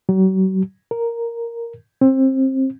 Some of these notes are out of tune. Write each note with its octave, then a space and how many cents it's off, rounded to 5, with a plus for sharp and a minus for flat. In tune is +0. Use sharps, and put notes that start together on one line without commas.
F#3 +40
A#4 +0
C4 +20